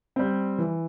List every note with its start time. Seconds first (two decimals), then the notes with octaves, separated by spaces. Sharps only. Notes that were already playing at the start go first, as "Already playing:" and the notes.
0.16 G3 C4
0.58 E3